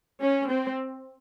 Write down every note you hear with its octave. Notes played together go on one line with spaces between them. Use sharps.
C#4
C4